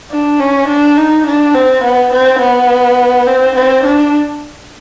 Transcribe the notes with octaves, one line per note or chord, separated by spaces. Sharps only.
D4
C#4
D4
D#4
D4
C4
B3
C4
B3
C4
C4
D4